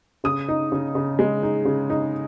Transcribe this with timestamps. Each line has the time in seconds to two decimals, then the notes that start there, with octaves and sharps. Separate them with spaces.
0.24 C#3 D#6
0.48 D#4
0.72 C#3
0.95 C#3
1.19 G#3
1.43 D#4
1.65 C#3
1.90 D#4